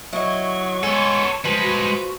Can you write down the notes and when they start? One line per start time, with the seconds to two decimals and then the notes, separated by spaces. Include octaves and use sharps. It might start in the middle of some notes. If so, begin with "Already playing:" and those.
0.13 F#3 E4 D#5 C#6
0.83 G#3 B3 A4 C#5
1.45 F3 G3 G#3 B4
1.62 F#4